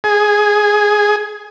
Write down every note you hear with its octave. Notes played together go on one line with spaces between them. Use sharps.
G#4